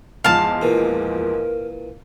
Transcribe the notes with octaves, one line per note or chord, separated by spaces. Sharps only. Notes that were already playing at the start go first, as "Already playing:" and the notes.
E2 G#2 F3 F5 A5
A#2 E3 A#4